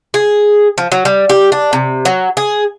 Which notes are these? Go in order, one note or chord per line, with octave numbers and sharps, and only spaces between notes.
G#4
F3
F#3
G3
G4
D4
C3
F#3
G#4